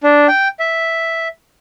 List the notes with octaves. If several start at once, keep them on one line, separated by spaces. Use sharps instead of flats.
D4
G5
E5